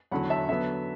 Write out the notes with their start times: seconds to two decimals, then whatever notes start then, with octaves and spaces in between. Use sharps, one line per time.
0.12 E2 D3 F#3 F#5 B5
0.30 E5 A5
0.49 D3 F#3 B3 E5